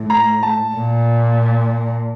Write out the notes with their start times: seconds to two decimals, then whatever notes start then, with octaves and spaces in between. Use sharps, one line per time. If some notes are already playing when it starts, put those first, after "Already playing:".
Already playing: A2
0.10 A#5
0.43 A5
0.75 A#2